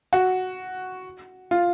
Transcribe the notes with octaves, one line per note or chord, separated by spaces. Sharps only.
F#4
F4